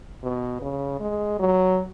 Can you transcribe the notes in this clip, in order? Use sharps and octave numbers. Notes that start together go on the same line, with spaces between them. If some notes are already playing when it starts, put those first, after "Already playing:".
B2
C#3
G#3
F#3